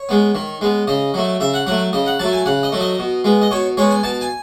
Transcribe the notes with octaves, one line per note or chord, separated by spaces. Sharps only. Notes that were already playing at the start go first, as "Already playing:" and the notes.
Already playing: C#5
G#3 B3
D#3
G#3 B3
C#3 D#5
F#3 A3
C#3 E5
F#5
F#3 A3 F#5
C#3 D#5
F#5
F#3 A3 A5
G#5
C#3 F#5
D#5
F#3 A3
D#5
B2
G#3 B3
D#5
B2 C#5
G#3 B3 C#5
G#5
B2 A5
G#5